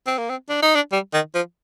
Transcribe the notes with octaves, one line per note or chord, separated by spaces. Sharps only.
C4
A#3
C4
D4
D#4
D4
G3
D#3
F3